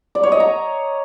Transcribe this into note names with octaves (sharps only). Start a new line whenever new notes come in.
D5
C#5
D#5
A#5